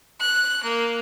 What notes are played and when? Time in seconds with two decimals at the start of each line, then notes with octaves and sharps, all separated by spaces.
0.20 F#6
0.63 A#3